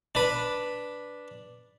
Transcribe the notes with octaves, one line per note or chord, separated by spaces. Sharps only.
D4 B4